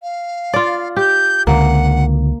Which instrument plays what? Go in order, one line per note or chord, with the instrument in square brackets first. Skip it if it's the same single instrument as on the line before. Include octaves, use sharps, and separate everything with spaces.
[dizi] F5
[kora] F4 D5
[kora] G4 [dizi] G6
[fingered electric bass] C#2 D3 [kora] A#3 [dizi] F#5